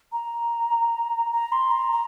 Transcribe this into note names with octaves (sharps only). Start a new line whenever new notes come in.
A#5
A#5
C6
A#5
A#5